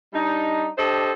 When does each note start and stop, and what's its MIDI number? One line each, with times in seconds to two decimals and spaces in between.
0.14 0.69 55
0.14 0.69 62
0.14 0.69 63
0.77 1.12 62
0.77 1.12 67
0.77 1.12 69
0.77 1.12 72
0.77 1.12 75